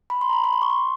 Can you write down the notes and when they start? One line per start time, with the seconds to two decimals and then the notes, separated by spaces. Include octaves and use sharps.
0.10 B5
0.21 C6
0.29 A#5
0.33 B5
0.44 B5
0.53 C6
0.62 C#6
0.70 C6